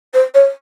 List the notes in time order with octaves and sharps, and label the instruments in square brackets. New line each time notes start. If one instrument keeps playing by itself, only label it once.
[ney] C5
C#5